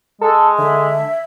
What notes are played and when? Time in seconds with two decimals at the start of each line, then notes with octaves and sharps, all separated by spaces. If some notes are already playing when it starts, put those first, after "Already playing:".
0.21 G#3 A4
0.59 D3 E5